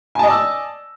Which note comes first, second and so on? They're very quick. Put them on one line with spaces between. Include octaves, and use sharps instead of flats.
G#5 A5 D#5 D5 E6